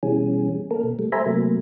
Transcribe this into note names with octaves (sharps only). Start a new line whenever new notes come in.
B2 E3 G3 C#4 G#4
A#3 A4 A#4
B2
G3 A3
C5 E5 G#5 A#5 B5
C3 F#3 A3 A#3